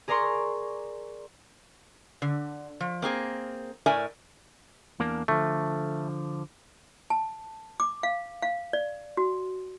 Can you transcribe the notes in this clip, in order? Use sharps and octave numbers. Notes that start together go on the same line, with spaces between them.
G#4 A#4 D5 A#5 C6 C#6
D3
F3
A#3 C4 G#4 A#4
A2 A#4 D5 E5 G#5
E2 A#3 D4
D3 F3 A3
A5
D6
F5
F5
D5
F#4